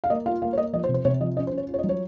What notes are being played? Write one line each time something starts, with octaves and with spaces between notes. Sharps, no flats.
F5
A#3 D#5
F4 F5
A#3 F5
C#5
A#3 D#5
F3 D#5
C5
C3
C5
C3 C#5
F3 D#5
C#4 D#5
C5
C#4
C#5
F4
C#5
D#5
F#3
C#5